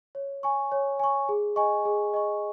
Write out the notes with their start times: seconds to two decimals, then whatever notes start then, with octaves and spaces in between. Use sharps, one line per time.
0.15 C#5
0.43 G#5 C#6
0.72 C#5
0.99 G#5 C#6
1.29 G#4
1.56 D#5 G#5 C#6
1.85 G#4
2.14 D#5 G#5 C#6